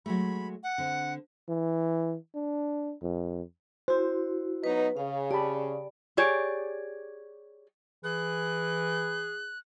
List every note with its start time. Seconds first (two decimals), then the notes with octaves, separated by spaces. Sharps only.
0.06 F#3 G#3 A3 B5
0.63 F#5
0.78 D3 C4
1.49 E3
2.35 D4
3.03 F2
3.88 E4 F#4 C5
4.64 F#3 B3 D#4 B4
4.97 C#3 F5
5.31 G4 D5 A5 B5
6.17 G4 G#4 C#5 D5
8.04 E3 G#4 F#6